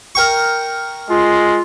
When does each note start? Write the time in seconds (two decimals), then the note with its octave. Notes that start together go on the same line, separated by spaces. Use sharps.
0.15 A#4 G5 C#6
1.10 G#3 F4